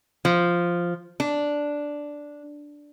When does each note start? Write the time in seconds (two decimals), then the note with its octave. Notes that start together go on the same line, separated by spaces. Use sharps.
0.25 F3
1.20 D4